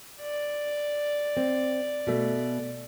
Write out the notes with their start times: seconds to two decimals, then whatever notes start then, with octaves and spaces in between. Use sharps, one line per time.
0.21 D5
1.37 C4
2.07 B2 A3